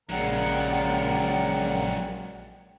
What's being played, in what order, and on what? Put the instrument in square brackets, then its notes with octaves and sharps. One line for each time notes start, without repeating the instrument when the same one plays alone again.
[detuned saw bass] A#1 [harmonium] C#3 A#4 [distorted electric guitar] F#3 G#3 [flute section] D5 F#5 G5